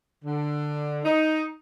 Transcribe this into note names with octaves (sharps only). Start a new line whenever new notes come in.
D3
D#4